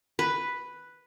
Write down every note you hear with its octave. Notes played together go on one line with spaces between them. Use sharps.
B4